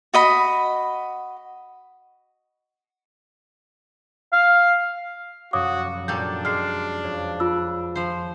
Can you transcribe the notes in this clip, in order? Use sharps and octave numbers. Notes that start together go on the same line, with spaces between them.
F#4 D#5 B5
F5
F1 F#2 F#4 C#5 F5 D6 D#6
A#2 G3 D4 A4 G6
G#3 F6 C7
F2 C#5
F4 B5 E6
F3 C5